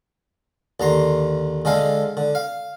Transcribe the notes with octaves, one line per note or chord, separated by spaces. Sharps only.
D#2 D3 A#5 C6
D3 G#3 A4 F5
D3
F5